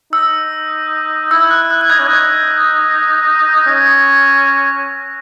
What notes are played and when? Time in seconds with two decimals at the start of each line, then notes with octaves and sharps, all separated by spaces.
0.13 D#4 E6
1.31 E4 E6
1.51 F#6
1.70 F#6
1.81 F#6
1.90 D#4 G#6
1.99 C#4
2.07 D#4
3.67 C#4 A#6